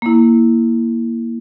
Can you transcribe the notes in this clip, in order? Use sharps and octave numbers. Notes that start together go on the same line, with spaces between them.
A#3 E4